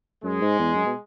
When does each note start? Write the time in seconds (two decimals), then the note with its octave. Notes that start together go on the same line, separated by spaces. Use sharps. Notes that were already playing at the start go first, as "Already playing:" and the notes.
0.23 F#2 G#3
0.41 G#2
0.59 E2
0.76 F#2
0.85 B2